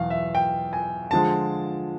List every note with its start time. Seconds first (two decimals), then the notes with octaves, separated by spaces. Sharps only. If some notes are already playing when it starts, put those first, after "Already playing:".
Already playing: E2 B2 F#3 F5
0.10 E5
0.35 G5
0.73 G#5
1.11 D3 F3 G#3 A5